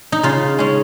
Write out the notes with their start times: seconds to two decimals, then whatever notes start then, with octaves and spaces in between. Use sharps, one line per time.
0.12 D#4
0.23 C#3 F4
0.59 G#3 C#4